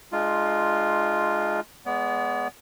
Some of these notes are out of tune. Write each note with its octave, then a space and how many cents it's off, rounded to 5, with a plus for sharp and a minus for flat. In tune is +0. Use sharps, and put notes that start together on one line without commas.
G#3 +20 D4 +40 F4 +0
G#3 +0 B3 +0 D5 -45